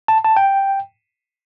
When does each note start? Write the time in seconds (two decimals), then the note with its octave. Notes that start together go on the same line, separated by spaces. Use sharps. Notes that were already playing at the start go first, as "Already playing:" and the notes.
0.08 A5
0.24 A5
0.37 G5